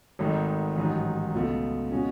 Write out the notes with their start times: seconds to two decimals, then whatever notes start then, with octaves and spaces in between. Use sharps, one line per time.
0.19 G#1 G#2 D#3 A3
0.77 A1 G#2 D#3 F#3
1.34 C#2 B2 A3
1.91 B2 G#3 C#4 F#4